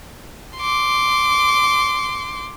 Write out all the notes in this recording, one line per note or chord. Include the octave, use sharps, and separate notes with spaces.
C6 D6